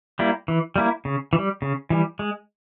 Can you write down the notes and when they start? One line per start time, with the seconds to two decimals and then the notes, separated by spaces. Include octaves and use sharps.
0.19 G3 A#3 E4
0.48 E3
0.76 G3 A#3 E4
1.05 C#3
1.33 E3
1.38 G3
1.62 C#3
1.90 E3 G3
2.19 G#3